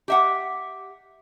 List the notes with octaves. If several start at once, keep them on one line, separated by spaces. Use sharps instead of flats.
G4 E5 F#5